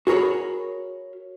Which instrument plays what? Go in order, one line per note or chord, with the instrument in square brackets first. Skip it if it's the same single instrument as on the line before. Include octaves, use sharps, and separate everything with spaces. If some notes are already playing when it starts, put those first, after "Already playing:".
[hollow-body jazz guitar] F#4 G#4 A#4 C#5 B5